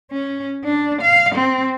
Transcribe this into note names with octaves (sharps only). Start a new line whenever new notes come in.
C#4
D4
F5
C4